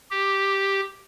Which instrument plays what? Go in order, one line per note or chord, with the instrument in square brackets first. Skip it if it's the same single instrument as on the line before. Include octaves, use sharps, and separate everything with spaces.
[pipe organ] G4